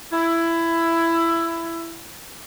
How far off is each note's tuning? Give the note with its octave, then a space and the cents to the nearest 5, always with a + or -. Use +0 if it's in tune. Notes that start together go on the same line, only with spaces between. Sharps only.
E4 +15